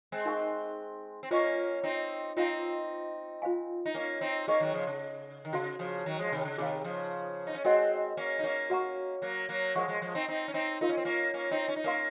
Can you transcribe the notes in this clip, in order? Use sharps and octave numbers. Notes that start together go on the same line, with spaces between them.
G#3 C4
D#4 A#4 F5 G#5 C#6
C4
A#3 C#4 F4 C5 D#5 G#5 C#6
C4 D#4
C4 D#4 F4 C5 F5
F4 C5 F5 G#5
D#4
A#3 C#4
C4 D#4
A#3 C#4 G#4 C5 D#5 G#5 C#6
D#3 F#3
C#3 F3
C#3
D#3
C#3 F#4 C5 F5 C6
C#3 F3
D#3 F#3
F3 G#3
C3 D#3
C#3
C3 D#3 G#4 C#5 F5
C#3 F3
D#4
C#4
G#3 C4 F#4 A#4 D#5 F#5 C6
A#3 C#4
D#4
A#3 C#4
F#4 C#5 F#5 A#5 C#6
F#3 A#3
F#3 A#3
F3 G#3 A#4 C#5 F#5 C#6
F3 G#3
F3 G#3
C4 D#4
C4 D#4
C#4
C4 D#4
D#4 F4 A#4 F5 C6
C#4
C4
A#3 C#4
A#3 C#4
C4 D#4
C#4
D#4
A#3 C#4 A#4 F5 C6